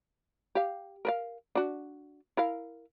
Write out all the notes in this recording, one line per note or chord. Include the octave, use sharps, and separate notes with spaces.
G4 F5
A#4 B4 F5
D4 F#4
E4 A#4 F5